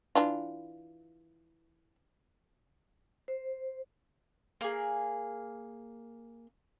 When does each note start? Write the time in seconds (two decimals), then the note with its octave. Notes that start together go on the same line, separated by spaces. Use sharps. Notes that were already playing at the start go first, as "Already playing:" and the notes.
0.15 E3 D4 F4
3.28 C5
4.61 A#3 G#4